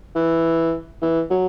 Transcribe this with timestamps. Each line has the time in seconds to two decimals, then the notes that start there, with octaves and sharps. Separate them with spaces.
0.15 E3
1.02 E3
1.30 F#3